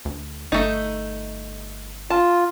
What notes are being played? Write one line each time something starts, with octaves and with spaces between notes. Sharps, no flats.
D2
G1 A3 D#4
F4 A5